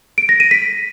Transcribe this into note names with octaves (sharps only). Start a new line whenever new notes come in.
D7
A#6
D#7
B6